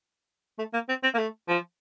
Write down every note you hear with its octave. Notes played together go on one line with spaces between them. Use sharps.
A3
A#3
C4
C4
A#3
A3
F3